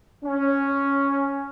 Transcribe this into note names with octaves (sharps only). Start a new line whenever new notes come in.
C#4